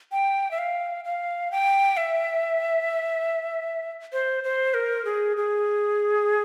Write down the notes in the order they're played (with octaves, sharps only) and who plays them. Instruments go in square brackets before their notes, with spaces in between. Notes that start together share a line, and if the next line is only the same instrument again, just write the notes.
[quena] G5
E5
F5
F5
G5
E5
C5
C5
A#4
G#4
G#4